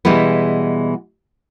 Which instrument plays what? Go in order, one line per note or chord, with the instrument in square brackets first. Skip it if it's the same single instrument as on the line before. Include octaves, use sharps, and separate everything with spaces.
[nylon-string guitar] B2 E3 G3 G#3 B3